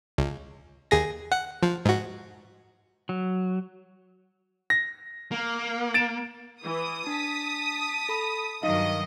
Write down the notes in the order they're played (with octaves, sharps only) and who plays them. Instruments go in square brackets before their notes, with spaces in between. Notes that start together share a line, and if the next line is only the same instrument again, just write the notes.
[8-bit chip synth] C#2
D#2 G#4 A#6
F#5
F3
G#2 F#4
[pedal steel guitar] F#3
[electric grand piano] A#6
[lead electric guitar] A#3
[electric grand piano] A6 D7 E7
[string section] E3 [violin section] D#6
[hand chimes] D4 [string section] A5 B6
[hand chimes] A4 B5
[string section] G2 D#3 F#3 [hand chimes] D#4 F5 [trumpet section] D#5